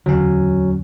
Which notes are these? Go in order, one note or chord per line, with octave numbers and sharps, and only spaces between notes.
D1 E2 D3 F#3 C#4